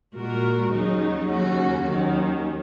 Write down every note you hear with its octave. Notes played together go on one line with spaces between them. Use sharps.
A#2 G#3 F#4 A#4
D#2 C#3 F#3 D#4
D#2 C#3 F#3 C#4 F#4
D#2 D#3 F#3 C#4